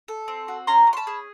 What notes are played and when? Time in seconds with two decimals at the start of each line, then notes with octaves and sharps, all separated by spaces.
0.08 A4
0.28 C4
0.48 F#4
0.67 C#4 A#5 C6
0.87 C#4
0.93 C6
0.97 A5 B5
1.07 G#4